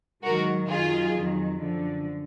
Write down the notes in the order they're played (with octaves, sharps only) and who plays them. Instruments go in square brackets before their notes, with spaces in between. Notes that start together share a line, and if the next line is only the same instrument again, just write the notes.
[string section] G#2 D#3 F#3 F#4 A#4
F#2 D#3 F#3 F4 G#4
F2 D#3 F#3
F#2 D3 F3